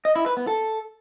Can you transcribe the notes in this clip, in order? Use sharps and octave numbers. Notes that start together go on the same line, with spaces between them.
D#5
E4
B4
B3
A4